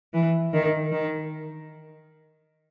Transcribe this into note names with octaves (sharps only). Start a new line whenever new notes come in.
E3
D#3
D#3